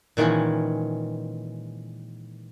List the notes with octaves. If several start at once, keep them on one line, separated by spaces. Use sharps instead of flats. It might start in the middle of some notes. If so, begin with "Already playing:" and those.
A#2 D#3 E3 G#3 C#4